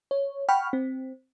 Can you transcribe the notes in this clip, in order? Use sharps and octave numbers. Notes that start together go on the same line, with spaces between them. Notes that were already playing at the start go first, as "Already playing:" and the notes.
C#5
F#5 G5 B5 C#6 F6
C4